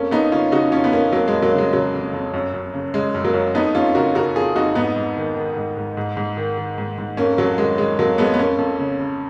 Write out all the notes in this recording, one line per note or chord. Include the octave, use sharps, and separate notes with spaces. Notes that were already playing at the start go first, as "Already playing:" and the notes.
Already playing: F2 A#3 C#4
F2 B3 D#4
C#3 C#4 F4
C#3 D#4 F#4
F2 C#4 F4
B3
F2 A#3 C#4
F2 F#3 A#3
F2 G#3
F#3 A#3
C#3
G#3
C#3 F#3
F2
F2
F#2
F#2
C#3
C#3 G#3
F#2
F#3 A#3
F#2
F2 B3 D#4
F2 C#4 F4
C#3 F#4 A#4
C#3 F#4 A#4
F2 F4 G#4
F2 D#4 F#4
G#2 B3 D#4
G#2
D#3
D#3
G#2
G#2
G#2
G#2
D#3
D#3
G#2
G#2
F2 A#3 C#4
F2 F#3 A#3
D#3 G#3
D#3 G#3
F2 F#3 A#3
F2 G#3 B3
B3
F2 A#3 C#4
F2
C#3
C#3